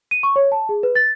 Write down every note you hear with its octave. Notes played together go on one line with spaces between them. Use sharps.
D#7
C#6
C#5
A5
G#4
B4
A6